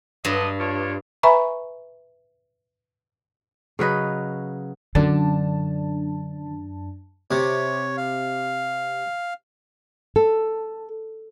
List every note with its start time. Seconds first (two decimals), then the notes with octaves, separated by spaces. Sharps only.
0.25 G2 D3 F#3 D#5
0.59 D4 F4 C#5
1.23 B4 E5 G#5 A#5 B5 C#6
3.79 C#3 F#3 B4 D#5
4.95 F#2 D3 D4 A5
7.31 C3 C#5
7.97 F5
10.16 A4